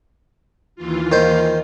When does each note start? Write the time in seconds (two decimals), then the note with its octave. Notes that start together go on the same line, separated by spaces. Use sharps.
0.75 D#2 E3 F4
1.12 D#3 C5